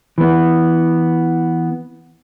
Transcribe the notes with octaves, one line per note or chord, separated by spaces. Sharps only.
E3 B3